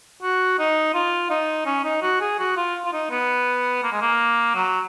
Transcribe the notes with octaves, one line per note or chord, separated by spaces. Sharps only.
F#4
D#4
F4
D#4
C#4
D#4
F#4
G#4
F#4
F4
F4
D#4
B3
A#3
G#3
A#3
F#3